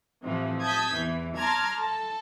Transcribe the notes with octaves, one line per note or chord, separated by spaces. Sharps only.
A2 C3 E3 F3
A5 D#6 G6 G#6 B6
E2 E3
A5 A#5 C6 D6 F6 G#6
A4 A5